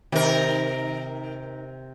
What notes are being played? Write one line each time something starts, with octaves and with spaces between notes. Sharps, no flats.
C3 D#3 D#4 A#4